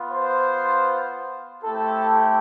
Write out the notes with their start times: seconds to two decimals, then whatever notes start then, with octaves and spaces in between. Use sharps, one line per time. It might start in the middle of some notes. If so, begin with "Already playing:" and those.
Already playing: B3 F4
0.11 C5
1.62 A3 C4 E4 G4 A4